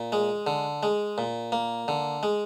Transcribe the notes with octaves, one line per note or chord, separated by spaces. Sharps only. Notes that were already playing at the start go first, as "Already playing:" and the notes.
Already playing: A#2
G#3
D3
G#3
A#2
A#3
D3
G#3